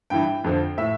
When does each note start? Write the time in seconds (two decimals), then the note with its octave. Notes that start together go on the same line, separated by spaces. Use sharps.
0.10 G2 E3 G5
0.44 F2 D3 F3
0.78 A2 E5